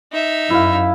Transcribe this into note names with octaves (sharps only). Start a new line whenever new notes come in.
D#4 E5
F#2 E4 F5